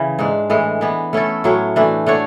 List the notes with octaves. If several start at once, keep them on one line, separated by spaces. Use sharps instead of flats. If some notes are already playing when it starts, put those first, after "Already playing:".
Already playing: C#3 E3
G#2 G#3 D4
A2 E3 G#3
E3 B3 D4
A3 C#4 E4 A4
A2 F#3 C#4
E3 A3 D4
A3 D4 F#4 C#5